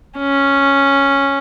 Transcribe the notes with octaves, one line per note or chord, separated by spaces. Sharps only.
C#4